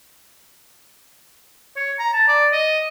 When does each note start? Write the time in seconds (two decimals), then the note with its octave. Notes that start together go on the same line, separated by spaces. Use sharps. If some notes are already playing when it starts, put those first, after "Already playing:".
1.76 C#5
1.99 A#5
2.13 A5
2.28 D5
2.52 D#5